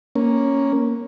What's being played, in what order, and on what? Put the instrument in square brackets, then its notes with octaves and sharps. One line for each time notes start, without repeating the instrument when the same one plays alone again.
[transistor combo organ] A#3 C#4